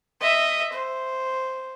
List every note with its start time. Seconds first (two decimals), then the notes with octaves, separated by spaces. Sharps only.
0.21 D#5 E5
0.73 C5